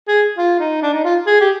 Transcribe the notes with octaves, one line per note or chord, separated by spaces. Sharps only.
G#4
F4
D#4
D4
D#4
F4
G#4
G4